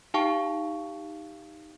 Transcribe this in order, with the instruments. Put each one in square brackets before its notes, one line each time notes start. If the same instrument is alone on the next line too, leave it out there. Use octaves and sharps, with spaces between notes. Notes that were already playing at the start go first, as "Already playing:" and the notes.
[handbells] D#4 G4 F5 G5 A5 C#6